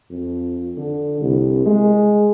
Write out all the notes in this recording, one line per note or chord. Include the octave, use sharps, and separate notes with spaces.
F2
D3
C2
G#3